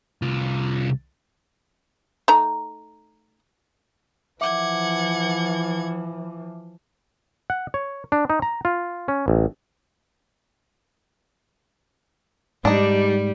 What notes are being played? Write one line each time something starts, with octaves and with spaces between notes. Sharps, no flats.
C2 F4
A3 D#4 A#5
E3 F3 E5 F#5 D6 G#6
F#5
C#5
D4
D#4
A#5
F4
C#4
A1
G#2 G3 D4 D#4